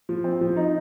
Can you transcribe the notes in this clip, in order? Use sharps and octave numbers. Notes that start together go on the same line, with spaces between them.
F3
C4
F3
D#4